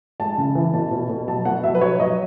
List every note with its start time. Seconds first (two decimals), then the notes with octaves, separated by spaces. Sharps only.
0.20 G#3 A5
0.38 C#3
0.55 E3
0.74 B2 A5
0.91 B2
1.09 B2
1.28 F#3 A5
1.45 B2 F#5
1.64 F#3 E5
1.75 B4
1.81 F#3 C#5
1.99 F#3 D#5